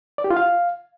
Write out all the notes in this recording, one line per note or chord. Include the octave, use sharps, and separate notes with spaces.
D5
G4
F4
F5